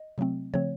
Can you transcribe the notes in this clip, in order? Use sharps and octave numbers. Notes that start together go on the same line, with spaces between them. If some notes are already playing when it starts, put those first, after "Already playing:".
Already playing: D#5
C3 F#3 A3 C4
C#3 F3 A3 C4 C#5